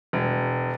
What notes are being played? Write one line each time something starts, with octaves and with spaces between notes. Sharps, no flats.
E1